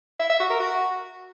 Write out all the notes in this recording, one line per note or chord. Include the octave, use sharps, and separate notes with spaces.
E5
E5
F#4
A#4
F#4